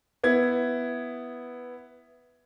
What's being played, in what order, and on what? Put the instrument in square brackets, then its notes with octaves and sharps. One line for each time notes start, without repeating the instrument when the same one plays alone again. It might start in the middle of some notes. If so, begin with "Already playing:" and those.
[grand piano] B3 E4 G#6